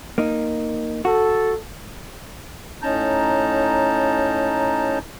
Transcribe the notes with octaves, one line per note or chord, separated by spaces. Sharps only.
A#3 D#4
F#4 A4
A2 C#4 D#4 A5 A#5 G6